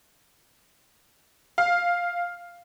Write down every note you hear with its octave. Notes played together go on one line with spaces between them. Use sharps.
F5